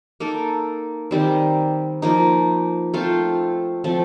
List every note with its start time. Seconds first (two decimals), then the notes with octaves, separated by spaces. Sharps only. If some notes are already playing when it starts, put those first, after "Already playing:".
0.20 A#3 D#4 A4
1.11 D#3 G3 C4
2.02 F3 A#3 D#4
2.94 A3 C4 F4 C5
3.84 F3 A3 C4